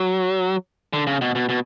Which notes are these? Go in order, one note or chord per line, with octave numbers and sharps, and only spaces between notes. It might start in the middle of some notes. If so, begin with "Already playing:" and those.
Already playing: F#3
D3
C#3
B2
B2
B2